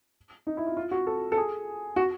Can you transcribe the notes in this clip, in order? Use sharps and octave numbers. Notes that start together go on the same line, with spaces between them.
D#4
E4
F4
F4
F#4
A4
A4
G#4
F#4